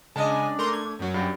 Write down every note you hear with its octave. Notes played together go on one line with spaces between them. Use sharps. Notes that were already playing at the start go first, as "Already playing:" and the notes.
C#3 G#3 D4 D#5 G#5 A5
A3 A#4 A#5 C6
G#6
F#2 F#3
G2 G4